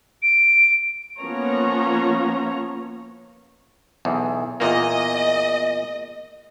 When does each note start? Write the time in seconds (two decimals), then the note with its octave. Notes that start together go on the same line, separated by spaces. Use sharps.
0.23 D7
1.19 F3 A#3 B3 C#4 C#5 A#5
4.05 B1 E2
4.60 E2 A#2 A#3 D#5